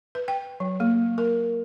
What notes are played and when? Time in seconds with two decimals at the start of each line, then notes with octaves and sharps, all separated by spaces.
0.15 B4
0.28 G5
0.60 F#3
0.80 A#3
1.18 A#4